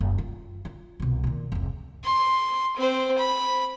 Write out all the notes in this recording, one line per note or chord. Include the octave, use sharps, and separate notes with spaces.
F#1
F4
F4
C2 B2
A#2 D#3
F1 C#2
C6
C4 C5
B5